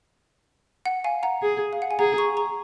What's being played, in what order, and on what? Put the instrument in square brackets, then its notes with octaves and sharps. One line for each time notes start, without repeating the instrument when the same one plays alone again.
[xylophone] F#5
F5 G#5
F#5 A#5
[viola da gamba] G#4
[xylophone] F5
F#5
G#5
[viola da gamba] G#4 [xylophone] F#5 A#5
[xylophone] A#5 C#6
A#5 C#6